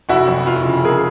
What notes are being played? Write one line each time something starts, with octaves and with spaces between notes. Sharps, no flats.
F1 E4 F#4
F2
F1 F4
C#3
G#4 A#4